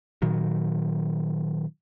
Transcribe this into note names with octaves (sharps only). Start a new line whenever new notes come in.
A#2 D#3 F#3